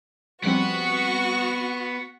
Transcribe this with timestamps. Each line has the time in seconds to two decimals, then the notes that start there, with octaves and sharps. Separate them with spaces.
0.44 F3 G3 B3 C4 F#4 F#5 C#6